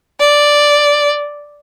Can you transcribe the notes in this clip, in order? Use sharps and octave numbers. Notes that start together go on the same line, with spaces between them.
D5